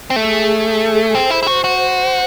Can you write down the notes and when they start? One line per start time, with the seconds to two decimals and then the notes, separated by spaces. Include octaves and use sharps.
0.10 C4
0.16 A3 G#4
0.65 A4
1.14 C4 C5
1.30 E4
1.43 E4
1.47 F#4
1.63 F#4 C5